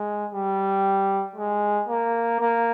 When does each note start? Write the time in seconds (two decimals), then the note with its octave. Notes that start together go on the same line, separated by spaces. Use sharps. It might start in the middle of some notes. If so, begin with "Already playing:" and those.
Already playing: G#3
0.31 G3
1.36 G#3
1.88 A#3
2.40 A#3